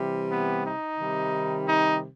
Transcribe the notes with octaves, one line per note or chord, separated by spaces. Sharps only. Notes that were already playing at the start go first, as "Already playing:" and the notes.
Already playing: C3 E3 G3
B3
D#4
C3 D#3 G3
D#4